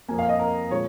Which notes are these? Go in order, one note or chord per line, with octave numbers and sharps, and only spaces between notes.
F2 F3 A#3 G#5
F5
D#5
A#4
A#2 F3 G#3 C#5